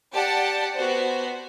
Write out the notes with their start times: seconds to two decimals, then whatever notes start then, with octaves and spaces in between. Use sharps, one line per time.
0.12 G4 D5 F#5 A5
0.75 B3 F#4 C5